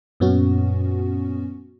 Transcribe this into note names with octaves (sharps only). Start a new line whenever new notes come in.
F#2 A#2 B3 C#4 F#4